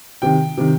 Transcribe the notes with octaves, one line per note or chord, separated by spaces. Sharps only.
C3 D#3 G5
C3 D#3